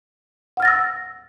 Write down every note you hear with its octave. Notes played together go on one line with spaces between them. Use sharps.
F#5 E6 F6 A6 A#6